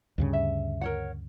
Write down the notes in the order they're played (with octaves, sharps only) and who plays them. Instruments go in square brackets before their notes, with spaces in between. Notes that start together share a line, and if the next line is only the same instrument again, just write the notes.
[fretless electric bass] D2 G2 C#3
[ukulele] E5
A#4 C#5 F#5